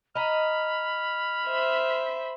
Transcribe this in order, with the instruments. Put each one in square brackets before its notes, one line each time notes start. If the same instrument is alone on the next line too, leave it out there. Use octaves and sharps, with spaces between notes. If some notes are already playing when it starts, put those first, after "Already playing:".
[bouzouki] D#5 A#5 [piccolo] B5 [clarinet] F6
[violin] C5 E5